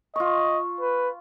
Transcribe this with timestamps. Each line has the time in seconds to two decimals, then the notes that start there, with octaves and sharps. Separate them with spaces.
0.16 F4 D#5 C#6
0.80 B4